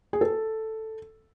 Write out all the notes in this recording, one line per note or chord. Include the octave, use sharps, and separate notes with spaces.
G#4
A4